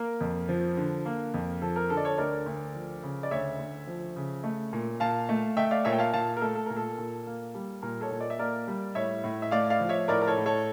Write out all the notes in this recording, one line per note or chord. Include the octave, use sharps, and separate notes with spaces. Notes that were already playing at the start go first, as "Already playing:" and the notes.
Already playing: A#3 A#4
F2
F3
D3
A#3
F2
F3 A4
A#4
D3 A4
D5
A4 C#5
D2 A#4 D5
D2
F3
C#3
D5
D2 C#5 E5
D2
F3
C#3
A3
A#2
A#2 F5 A5
A3
A3 E5 G5
D5 F5
A#2 C#5 E5
G5
F5 A5
A#2 F5 A5
A#4
A3 A4
A4
A#2 A#4
A4
A#2
A#3
G3
A#2 A#4
A4 C#5
A#2
D5
E5
A#3 A#4 D5
G3
A2 C#5 E5
A2
E5
A3 D5 F5
D5 F5
F3
C#5 E5
A2 A#4 D5
A#4
A4 C#5
A2
A4 C#5